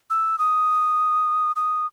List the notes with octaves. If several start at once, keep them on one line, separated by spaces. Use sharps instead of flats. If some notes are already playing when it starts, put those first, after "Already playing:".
E6
D#6
D#6